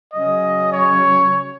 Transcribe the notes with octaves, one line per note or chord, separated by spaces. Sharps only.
C#3 F#3 C#4 D#5
C#5